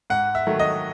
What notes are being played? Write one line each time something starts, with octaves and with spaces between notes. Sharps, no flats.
G#2 F#5
E5
D#3 F#3 A3
D#5